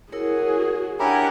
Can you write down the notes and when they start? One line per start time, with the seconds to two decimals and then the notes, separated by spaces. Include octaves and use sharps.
0.12 E4 F#4 G#4 A#4 C#5
0.99 D4 E4 G4 A#4 C#5 F#5 G#5